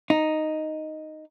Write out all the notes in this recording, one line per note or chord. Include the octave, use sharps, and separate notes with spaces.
D#4